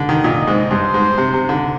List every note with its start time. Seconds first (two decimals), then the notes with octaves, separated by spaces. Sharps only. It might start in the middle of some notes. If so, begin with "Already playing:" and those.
Already playing: D3
0.09 D#3
0.24 A#2 D#5
0.47 G#2
0.71 G2 C5
0.94 G#2
1.18 C3
1.34 C3
1.49 D3